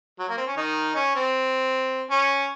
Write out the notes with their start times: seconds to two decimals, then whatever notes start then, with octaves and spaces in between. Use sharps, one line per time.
0.19 F#3
0.29 A#3
0.37 C4
0.47 C#4
0.57 D#3 D#4
0.95 C#4
1.15 C4
2.10 C#4